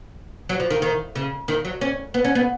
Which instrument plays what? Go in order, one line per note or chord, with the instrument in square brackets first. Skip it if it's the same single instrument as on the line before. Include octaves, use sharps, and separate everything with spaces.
[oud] F#3
F3
D#3
D#3
C#3
D#3
F#3
C#4
B3
C#4
B3